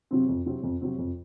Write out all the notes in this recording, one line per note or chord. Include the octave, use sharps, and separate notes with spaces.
C3 F#3 C4
F2
C3 F#3 C4
F2
C3 F#3 C4
F2